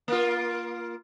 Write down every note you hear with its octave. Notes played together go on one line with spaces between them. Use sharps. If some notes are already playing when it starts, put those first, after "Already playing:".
A#3 F4